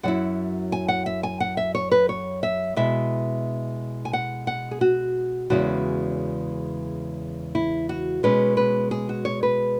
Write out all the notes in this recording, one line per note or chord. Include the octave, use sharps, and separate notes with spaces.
F#2 F#3 E4 F#5
G#5
F#5
E5
G#5
F#5
E5
C#5
B4
C#5
E5
B2 G#3 E4 E5
G#5
F#5
F#5
G#4
F#4
E2 C#3 G#3 C#4 E4 F#4
E4
F#4
B2 G#3 C#4 B4
B4
G#4
F#4
C#5
B4